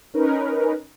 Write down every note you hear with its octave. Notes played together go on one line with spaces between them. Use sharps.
C#4 D#4 A#4 B4